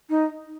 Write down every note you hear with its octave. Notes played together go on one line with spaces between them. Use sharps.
D#4